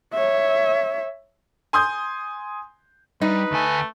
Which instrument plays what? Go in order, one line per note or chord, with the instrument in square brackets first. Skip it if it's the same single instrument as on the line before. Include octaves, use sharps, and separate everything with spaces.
[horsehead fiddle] C#5 E5
[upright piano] G#5 C6 D#6 G6
[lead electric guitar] G3 [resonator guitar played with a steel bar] D#4 [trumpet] B4
[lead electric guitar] D2 G#5 [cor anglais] A3